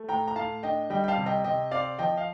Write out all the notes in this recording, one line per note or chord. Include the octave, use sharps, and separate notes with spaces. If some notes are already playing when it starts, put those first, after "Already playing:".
Already playing: A3
A2 G5 A#5
A#5
A2 F5 A5
D4 D#5 G5
G3 D#5 G5
G5
F5 A5
C3
D#5 G5
C3 D#5 G5
C4 D5 F5
F3 D#5 G5
F5